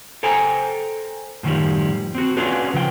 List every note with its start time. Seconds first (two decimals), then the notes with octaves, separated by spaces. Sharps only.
0.23 A4 C5 G5 G#5 A#5
1.43 F#2 A2 D#3 F3 G3
2.15 C4 F#4
2.37 C#4 D4 F4 F#4 G#4 B4
2.74 C#3 F3 B4 G5